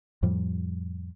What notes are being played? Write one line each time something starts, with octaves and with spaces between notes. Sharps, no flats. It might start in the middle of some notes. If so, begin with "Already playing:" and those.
F2 A2 F3 G3